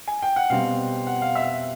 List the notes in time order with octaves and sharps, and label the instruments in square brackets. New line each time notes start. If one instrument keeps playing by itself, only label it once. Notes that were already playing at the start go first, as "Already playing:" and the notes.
[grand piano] G#5
G5
F#5
B2 G3 C4 F5
F#5
F5
E5